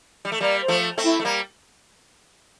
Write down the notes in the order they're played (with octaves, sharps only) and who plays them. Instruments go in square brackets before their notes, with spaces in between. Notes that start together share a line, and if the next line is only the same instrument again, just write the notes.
[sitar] G3
A3
[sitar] G3 A#3 [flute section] D5
[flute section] C5
[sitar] F3 A3
A3 C4
[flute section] E4
[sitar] A3
G3 A#3